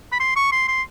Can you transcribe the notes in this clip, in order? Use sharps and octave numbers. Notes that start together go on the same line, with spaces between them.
B5
C6
C#6
C6
C6